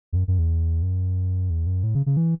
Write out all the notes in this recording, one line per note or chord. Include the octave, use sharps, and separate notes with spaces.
E2
F#2
F#2
E2
F#2
E2
F#2
A2
C#3
C#3
E3